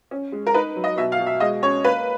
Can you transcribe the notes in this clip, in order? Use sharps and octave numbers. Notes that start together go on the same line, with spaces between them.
C#4
G#3
A#4
D#4 B4
F#3
D#5
B2 E5
F5
B2
E5
G#3 D#5
C#4 C#5
A#3 B4